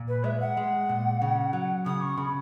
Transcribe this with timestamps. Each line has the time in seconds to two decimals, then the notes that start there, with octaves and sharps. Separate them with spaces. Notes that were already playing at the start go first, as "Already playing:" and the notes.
Already playing: A#2
0.08 B4
0.24 G#3 E5
0.41 F#5
0.57 G#3
0.89 A#2
1.22 C#3
1.53 F#3
1.86 C#3 D#6
2.01 C#6
2.18 C#3 B5